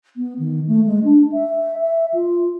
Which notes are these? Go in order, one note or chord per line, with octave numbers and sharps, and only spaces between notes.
B3
D#3
A3
G#3
D4
E5
E5
F4